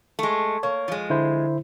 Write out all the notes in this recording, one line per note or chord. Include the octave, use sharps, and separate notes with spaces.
G#3 A3
A#3 C#5
F3 G#3
D3 E4 C5